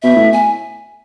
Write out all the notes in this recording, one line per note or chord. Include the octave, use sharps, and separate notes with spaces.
B2 E5
A2
G#5